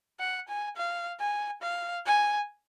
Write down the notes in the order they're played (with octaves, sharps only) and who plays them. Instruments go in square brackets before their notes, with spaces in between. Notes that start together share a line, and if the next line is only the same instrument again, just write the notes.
[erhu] F#5
G#5
F5
G#5
F5
G#5